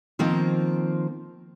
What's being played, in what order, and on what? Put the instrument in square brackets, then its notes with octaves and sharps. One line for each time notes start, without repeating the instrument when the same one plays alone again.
[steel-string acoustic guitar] D#3 F3 A#3 C4